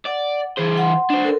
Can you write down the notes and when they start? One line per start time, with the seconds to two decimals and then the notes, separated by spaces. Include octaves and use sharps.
0.06 D5 F#5
0.57 E3 G#4 C5
0.78 F#5 C6
1.10 D4 C5
1.24 A4 A#4